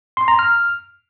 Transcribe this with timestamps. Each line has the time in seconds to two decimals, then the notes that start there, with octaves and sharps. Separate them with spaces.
0.17 C6
0.28 A#5
0.39 F6